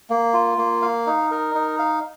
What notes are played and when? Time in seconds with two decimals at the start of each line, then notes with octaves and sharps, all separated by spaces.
0.10 A#3
0.34 F4
0.58 A#3
0.82 F5
1.07 D#4
1.31 A#4
1.55 D#4
1.79 F5